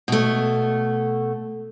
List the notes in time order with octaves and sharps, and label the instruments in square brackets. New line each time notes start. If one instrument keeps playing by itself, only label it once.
[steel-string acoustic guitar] B2 A3